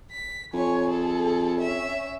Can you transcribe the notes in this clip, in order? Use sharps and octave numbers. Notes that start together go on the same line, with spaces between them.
B6
F2 C#5 G#5
G#4 A4
C#4 E5